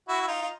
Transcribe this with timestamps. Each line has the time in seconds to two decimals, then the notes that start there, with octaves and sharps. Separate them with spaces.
0.08 E4 F#4
0.21 E4
0.28 D#4 F4
0.42 F4